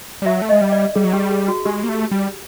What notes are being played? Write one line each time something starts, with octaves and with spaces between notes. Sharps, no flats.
G3
F#3 E5
A3
G#3 D#5
G3
D5
G3 G#4
F#3
G3 G4
G#4
F#4
G#3 G4
A#3
A3
G3